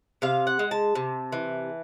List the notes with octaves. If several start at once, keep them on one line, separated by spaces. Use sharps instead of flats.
C3 F5
F#5
G#3
A5
C3
E3